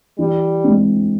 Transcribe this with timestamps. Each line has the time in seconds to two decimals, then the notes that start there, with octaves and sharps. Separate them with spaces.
0.19 E3 G3
0.64 G#3 C4